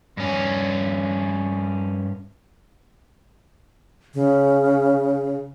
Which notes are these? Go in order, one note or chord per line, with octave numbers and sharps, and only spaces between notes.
G2 C#4
C#3